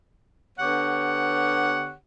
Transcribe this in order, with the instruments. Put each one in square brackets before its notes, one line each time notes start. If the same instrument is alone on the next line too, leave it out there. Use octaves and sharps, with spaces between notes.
[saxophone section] D3 B3 G4 C#5 F#5